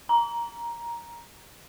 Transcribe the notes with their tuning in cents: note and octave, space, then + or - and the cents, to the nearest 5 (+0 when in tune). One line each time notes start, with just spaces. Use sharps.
A#5 +10